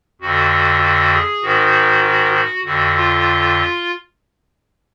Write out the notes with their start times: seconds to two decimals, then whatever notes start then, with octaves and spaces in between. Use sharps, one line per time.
0.21 F2 D3 F#4
0.82 F#4
1.13 G#4
1.43 G#2 D#3 F#4
2.04 F#4
2.34 F#4
2.65 F2 D3 F#4
2.95 F4